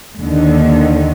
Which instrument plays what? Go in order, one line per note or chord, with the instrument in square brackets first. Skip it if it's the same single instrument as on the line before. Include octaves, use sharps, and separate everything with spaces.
[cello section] D#2 D3 D#3